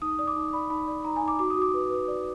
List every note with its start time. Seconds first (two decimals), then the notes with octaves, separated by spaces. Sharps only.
0.02 D#4 D#6
0.19 D5 D#6
0.27 D6
0.36 D#4
0.53 D5 B5
0.70 D#4 B5
0.88 D5
1.05 D#4 A#5
1.16 G#5
1.22 D#4
1.28 D6
1.39 F#4 D6
1.50 D#6
1.57 F#4
1.62 D6
1.74 B4
1.90 B4
2.08 D5